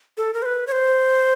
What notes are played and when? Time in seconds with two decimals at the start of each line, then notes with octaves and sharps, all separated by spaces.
0.17 A4
0.34 A#4
0.42 C5
0.46 B4
0.67 C#5
0.72 C5